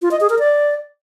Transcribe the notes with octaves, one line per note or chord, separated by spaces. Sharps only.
F4
D#5
G#4
A#4
D5